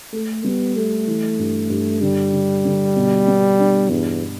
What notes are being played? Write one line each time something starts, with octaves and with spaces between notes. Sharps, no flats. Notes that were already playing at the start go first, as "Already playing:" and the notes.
A3 A4
G3 B3
A3 A4
E3
G2
G2
D3 G3
D3
D3
B2
B3
D4
E2 G2